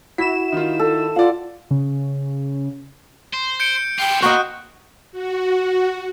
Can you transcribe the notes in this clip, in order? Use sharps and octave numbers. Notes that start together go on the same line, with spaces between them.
E4 F#4 B6 E7
D#3 F4
A4
F4 D5 F5 F#5
C#3
C5
G6 C#7 D7
E4 F4 G5
A#3 F#4 D#5 F#6
F#4